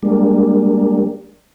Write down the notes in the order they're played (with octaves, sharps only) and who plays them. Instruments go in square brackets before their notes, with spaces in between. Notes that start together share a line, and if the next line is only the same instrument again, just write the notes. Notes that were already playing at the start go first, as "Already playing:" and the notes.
[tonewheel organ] G3 G#3 A#3 D4